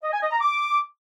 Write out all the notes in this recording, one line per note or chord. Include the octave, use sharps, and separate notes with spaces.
D#5
G#5
D#5
A#5
D6